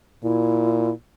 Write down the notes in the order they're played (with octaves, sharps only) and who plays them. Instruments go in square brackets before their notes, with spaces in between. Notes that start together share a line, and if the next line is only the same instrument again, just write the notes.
[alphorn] A#2 [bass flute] E4